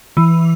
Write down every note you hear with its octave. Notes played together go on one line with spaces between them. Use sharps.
E3